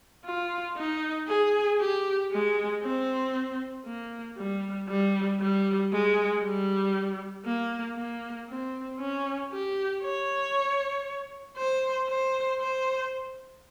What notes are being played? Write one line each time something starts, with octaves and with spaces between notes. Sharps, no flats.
F4
D#4
G#4
G4
G#3
C4
A#3
G3
G3
G3
G#3
G3
A#3
A#3
C4
C#4
G4
C#5
C5
C5
C5